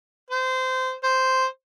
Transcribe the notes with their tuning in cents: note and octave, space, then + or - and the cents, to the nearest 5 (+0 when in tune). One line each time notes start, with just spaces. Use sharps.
C5 -20
C5 -5